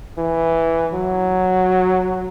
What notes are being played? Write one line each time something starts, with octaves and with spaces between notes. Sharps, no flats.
E3
F#3